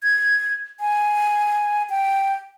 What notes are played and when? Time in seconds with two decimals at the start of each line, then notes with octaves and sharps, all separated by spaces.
0.03 G#6
0.80 G#5
1.90 G5